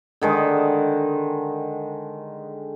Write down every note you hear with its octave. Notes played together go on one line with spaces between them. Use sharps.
D3 D#3 G#3